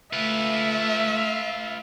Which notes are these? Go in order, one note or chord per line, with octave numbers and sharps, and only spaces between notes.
A3 F4 B4 E5